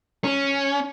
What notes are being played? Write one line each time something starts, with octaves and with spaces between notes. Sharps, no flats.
C#4